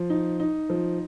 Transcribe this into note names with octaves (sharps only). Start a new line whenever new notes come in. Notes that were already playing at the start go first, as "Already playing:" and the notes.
Already playing: F3
D#4
D#4
F3